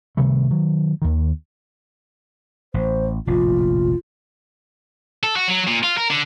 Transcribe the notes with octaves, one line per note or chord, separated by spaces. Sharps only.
C3 D#3 G3 A3
D#3 F#3
D#2 D#3
A1 C5
F1 A#1 A2 F4
A4
F#4
F#3
A#2
F4
A#4
D3